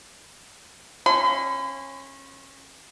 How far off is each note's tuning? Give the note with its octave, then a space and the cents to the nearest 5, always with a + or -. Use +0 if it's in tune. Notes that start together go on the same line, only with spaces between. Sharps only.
C#4 -25 B5 +45